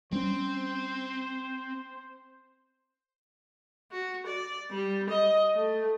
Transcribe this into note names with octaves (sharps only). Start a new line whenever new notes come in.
G3 C4 C#4 C5
F#4
D5
G3
D#5
A3